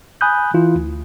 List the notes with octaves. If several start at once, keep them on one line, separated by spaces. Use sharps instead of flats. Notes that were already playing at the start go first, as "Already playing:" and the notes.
G#5 B5 D#6 F#6 G6
E3 E4 F4
D2